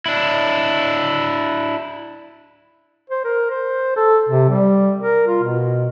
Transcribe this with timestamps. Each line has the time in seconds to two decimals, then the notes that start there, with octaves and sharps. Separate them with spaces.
0.06 D4 E4
3.10 C5
3.25 A#4
3.50 C5
3.97 A4
4.29 C3
4.50 G3
4.98 A#4
5.27 F4
5.44 B2